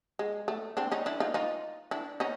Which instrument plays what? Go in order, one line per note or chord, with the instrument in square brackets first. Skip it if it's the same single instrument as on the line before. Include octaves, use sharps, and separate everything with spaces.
[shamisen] G#3
A3
C4 D4
C#4 D#4
D4 E4
D#4 F4
D#4 F4
D4 E4
C#4 D#4